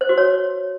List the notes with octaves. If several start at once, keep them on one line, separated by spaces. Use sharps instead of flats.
C5
F#4
C#5